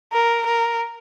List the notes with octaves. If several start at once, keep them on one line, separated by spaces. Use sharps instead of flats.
A#4
A#4